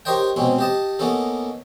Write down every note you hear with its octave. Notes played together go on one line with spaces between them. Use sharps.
G4 A#4 C5 C#5 D#5 G5
G#2 B2 C4 C#4
G4 D#5 A5
A#3 B3 C#4 D#4 A4